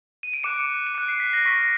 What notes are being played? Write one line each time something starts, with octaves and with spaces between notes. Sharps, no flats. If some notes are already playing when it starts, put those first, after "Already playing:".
D#7
D7
D6 F#6 C#7
D7
D6 F#6 C#7
C7
B6
A#6
C#6 F6 B6